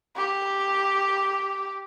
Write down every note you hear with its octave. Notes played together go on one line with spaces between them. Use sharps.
G4